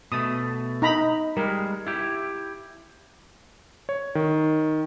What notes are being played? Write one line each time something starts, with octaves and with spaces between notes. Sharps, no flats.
B2 A3 D#6
D#4 A#5 B5
G3 G#3 A#4
E4 G4
C#5
D#3